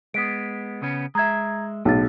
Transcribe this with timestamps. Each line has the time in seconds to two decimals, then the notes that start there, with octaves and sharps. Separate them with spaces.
0.14 G#3 B3 D#6 B6 D7
0.82 C#3 B3 C#4
1.15 G#3 E5 A#5 G#6
1.85 B1 A2 G#4 A6